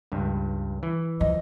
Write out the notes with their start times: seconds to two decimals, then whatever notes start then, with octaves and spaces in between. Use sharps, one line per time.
0.12 C#2 G2
0.83 E3
1.21 F3 D#5